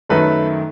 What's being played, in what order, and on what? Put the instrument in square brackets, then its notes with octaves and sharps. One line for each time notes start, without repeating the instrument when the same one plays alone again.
[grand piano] F#2 D#3 F#3 A3 A4 B4